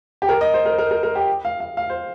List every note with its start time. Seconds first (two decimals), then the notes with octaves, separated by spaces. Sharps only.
0.22 G4
0.29 A#4
0.41 D#5
0.54 C5
0.66 A#4
0.78 A#4
0.91 A#4
1.03 A#4
1.16 G4
1.45 F5
1.60 F5
1.77 F5
1.90 C5